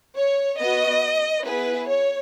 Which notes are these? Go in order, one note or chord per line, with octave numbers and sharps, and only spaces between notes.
C#5
B3 F#4 D#5
B3 E4 G#4 B4
C#5